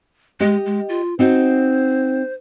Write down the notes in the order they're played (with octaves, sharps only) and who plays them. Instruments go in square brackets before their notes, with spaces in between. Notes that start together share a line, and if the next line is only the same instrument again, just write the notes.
[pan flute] G#3 [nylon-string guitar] G4 D#5
[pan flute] G#3
F4
[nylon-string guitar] C4 D#4 F#4 [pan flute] C5